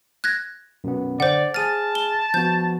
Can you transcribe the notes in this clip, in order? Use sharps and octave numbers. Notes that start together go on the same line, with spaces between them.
F#6 G#6 A#6
F#2 B2 B3
D3 C5 D5 F#5
G#4 A5 F6 A6 D#7
G7
F3 B3 F#4 G6